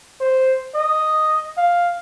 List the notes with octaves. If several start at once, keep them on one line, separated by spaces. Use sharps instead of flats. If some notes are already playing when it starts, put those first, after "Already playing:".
C5
D#5
F5